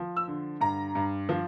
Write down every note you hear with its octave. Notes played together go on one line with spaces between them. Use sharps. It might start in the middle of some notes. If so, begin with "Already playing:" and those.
Already playing: F3
E6
D3
G2 A#5
G2
F3